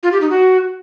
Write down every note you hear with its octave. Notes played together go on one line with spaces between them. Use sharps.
F4
G4
D#4
F#4